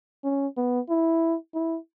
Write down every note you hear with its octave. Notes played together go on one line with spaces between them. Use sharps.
C#4
B3
E4
E4